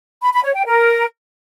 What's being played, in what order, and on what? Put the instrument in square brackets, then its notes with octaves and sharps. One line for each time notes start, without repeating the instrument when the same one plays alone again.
[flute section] B5
B5
C#5
G5
A#4